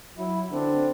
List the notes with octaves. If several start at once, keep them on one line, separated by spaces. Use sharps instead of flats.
F#3 E4
D3 C4 D4